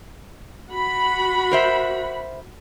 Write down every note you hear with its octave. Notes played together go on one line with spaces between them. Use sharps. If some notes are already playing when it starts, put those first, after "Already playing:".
F#4 B5
A#4 C5 E5